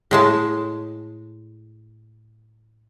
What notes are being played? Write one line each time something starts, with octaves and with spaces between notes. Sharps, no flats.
A2 G#3 A5